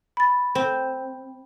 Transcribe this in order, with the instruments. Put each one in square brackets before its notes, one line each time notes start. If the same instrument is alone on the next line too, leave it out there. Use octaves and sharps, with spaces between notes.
[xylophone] B5 A6
[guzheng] C4